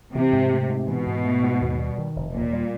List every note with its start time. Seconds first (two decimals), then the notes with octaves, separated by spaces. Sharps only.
0.14 C3 E3
0.33 G#2
0.51 A3
0.69 G#2
0.88 B2 E3
1.06 G#2
1.25 A3
1.43 G#2
1.61 D#2
1.79 G3
1.98 D#3
2.16 F1
2.35 D#2 A#2
2.53 G3